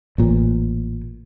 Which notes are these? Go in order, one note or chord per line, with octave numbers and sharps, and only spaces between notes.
A1 A#2